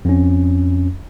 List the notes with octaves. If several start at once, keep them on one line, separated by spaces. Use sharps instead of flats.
F2 C#4